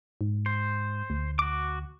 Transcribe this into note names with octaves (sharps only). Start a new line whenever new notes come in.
G#2
C5
D2
F#4 D6